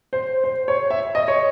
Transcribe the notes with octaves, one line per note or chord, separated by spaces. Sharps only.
C5
C5
C#5
E5
D#5
C#5